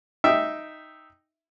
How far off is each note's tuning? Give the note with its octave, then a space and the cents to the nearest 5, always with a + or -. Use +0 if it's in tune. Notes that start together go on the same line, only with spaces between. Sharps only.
D#4 +0 E5 +0 G5 +0